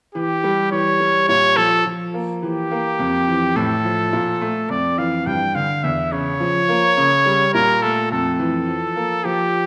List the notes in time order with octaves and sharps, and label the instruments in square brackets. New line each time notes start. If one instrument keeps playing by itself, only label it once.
[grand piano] E3 [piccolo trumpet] G4
[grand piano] G3
[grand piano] E3 [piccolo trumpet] C#5
[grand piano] G3
[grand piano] A#2 [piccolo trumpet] C#5
[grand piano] F3 [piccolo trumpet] A4
[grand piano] F3
A#3
[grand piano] E3 [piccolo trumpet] G4
[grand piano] A#3
F2
E3
[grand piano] A2 [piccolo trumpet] A4
[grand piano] F3
A#2
A3
[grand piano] F2 [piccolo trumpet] D5
[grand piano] E3 [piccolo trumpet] F5
[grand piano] G2 [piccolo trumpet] G5
[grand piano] D3 [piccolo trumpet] F5
[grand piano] E2 [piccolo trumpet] E5
[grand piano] C#3 [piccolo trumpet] C#5
[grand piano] F3
A#3
C#3
G3
[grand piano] A#2 [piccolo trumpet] A#4
[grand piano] A3 [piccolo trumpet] A4
[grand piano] F2 [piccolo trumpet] A4
[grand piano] E3
F3
A#3
[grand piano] F3 [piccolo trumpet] G4